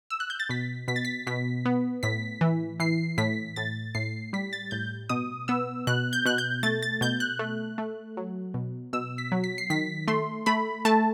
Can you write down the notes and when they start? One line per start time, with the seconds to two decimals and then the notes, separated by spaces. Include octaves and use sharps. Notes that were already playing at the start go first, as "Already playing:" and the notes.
0.10 E6
0.20 F#6
0.30 G6
0.40 A6
0.49 B2 B6
0.88 B2 B6
0.96 A6
1.05 B6
1.27 B2 B6
1.65 B3
2.03 A2 B6
2.41 E3
2.80 E3 C7
3.18 A2 B6
3.56 A2 A6
3.95 A2 C7
4.33 G3 B6
4.53 A6
4.71 A2 G6
5.09 B2 D#6
5.48 B3 E6
5.87 B2 F#6
6.13 G6
6.26 B2 F#6
6.38 G6
6.63 A3 A6
6.83 A6
7.01 B2 G6
7.20 F#6
7.39 A3
7.78 A3
8.17 F#3
8.54 B2
8.93 B2 E6
9.18 B6
9.32 F#3
9.44 B6
9.58 C7
9.70 D#3 B6
10.08 A3 C6
10.46 A3 B5
10.85 A3 A5